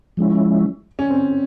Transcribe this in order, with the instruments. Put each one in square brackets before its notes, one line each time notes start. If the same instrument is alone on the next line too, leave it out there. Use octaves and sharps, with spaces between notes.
[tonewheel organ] F3 G#3 C#4 E4
[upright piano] C#4
C4